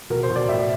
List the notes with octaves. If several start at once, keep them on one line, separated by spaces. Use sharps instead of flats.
B2 A#4
C5
B2
D5
A2 E5